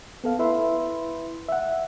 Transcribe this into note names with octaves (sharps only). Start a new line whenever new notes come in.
B3 A4 F5
E4 B4 E5 B5 C6
E5 F#5